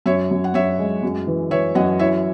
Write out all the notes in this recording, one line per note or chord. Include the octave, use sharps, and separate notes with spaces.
F#2 C#5 E5
F#2
F#5
F#2 C#5 E5
G#3
F#2
E3
E3 C#5 E5
F#2 D#5 F#5
E4 C#5 E5